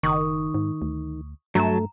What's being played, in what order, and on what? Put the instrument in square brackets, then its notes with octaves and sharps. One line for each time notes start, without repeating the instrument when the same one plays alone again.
[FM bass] F#1 [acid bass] D#3 [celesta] C#6 D#6
[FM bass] G#2
D2
[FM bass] G2 [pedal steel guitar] F#3 A5 [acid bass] A3 [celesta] A#5